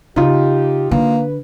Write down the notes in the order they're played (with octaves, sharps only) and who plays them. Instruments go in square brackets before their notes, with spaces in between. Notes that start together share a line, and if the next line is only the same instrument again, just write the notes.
[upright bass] C#3 [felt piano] D#4 F4 [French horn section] G4
[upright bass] D3 [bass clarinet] A#3 [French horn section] B4